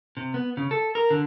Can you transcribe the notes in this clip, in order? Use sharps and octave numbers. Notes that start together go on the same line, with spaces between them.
C3
B3
C#3
A4
A#4
D3